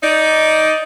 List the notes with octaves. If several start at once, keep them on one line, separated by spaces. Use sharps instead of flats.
D#4 D5